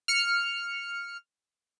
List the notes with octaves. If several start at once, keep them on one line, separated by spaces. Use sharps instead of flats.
F6 C#7